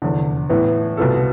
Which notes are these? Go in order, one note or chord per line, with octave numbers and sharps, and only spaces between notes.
F1 E2 D3
A2 E3 B3
C2 B2 B3 F4 A4